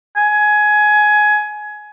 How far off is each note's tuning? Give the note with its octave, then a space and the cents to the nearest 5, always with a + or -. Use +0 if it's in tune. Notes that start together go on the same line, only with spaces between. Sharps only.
G#5 +15